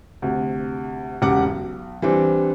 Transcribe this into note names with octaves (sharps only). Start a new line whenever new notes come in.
D2 C3
E1 C#3 G4 F#5 D6
B1
E3 G3 C4 D4